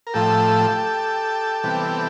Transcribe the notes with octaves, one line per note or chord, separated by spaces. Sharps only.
A#4
A2 F3 A3 G4 A4
C3 E3 G3 B3